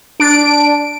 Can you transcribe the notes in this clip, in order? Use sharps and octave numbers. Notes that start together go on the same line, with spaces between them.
D4 D7